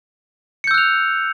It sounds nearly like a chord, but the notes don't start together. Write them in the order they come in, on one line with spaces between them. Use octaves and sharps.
C#7 G6 E6 F#6 F7